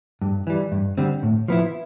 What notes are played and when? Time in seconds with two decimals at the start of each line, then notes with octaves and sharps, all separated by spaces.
0.22 G2
0.47 E3 G3
0.72 G2
0.98 D3 G3 C4
1.23 A2
1.48 F3 B3 E4